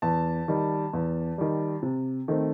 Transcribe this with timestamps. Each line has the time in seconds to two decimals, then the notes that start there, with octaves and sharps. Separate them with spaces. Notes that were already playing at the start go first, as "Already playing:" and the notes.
0.02 E2 A5
0.48 D#3 G3
0.93 E2
1.38 D#3 G3
1.83 C3
2.28 D#3 A3 C4